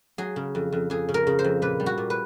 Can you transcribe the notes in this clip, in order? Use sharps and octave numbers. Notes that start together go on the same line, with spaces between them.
F#3 G#4
C#3
F2
F2
F2 G#4
C#3
A#4
C#3
C5
F2
A#2 B4
G3
F#4
A#2
B4